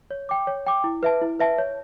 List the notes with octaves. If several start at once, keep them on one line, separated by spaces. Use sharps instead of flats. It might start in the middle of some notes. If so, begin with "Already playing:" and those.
C#5
G5 D6
C#5
G5 D6
E4
B4 E5 A5
E4
B4 E5 A5
C#5